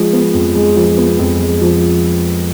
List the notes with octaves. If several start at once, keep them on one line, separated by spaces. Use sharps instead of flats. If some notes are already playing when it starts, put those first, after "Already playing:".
Already playing: F3 G#3
B3
F2
G#3
F3
B3
F2
G#3
F3